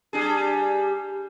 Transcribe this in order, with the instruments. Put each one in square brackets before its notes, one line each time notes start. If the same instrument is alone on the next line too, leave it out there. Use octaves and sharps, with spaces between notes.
[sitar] G3 D4 G#4